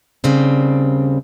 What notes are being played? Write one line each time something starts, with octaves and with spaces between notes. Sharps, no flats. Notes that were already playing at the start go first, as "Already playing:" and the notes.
D#2 C#3 G3 C4 D4